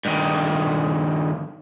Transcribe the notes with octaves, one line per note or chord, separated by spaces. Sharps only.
G2 D#3